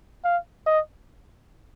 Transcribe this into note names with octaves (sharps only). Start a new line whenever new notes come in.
F5
D#5